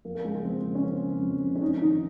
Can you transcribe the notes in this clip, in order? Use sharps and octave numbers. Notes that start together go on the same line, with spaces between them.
F2 A#3
A#3
C#3 G#3
G#3
F2 C4
C#3
C#4
F2 C4
C#3
F2
C#3
C#4
F2 D#4
D#3 D#4